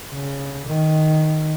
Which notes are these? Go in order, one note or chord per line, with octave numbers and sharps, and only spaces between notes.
C#3
D#3